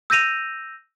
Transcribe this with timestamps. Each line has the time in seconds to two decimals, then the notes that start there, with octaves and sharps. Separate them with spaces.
0.10 E6 G6 A#6 D#7 F7